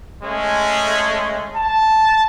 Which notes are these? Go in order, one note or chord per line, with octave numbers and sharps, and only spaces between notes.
G#3 A3 C#4
A5